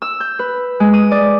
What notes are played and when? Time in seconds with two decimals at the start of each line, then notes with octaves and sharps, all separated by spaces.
0.02 E6
0.20 G6
0.39 B4
0.80 G#3
0.93 D#6
1.11 D5